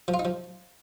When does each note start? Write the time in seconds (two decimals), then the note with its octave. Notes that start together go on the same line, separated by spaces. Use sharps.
0.08 F3
0.14 F4
0.19 D#4
0.25 F3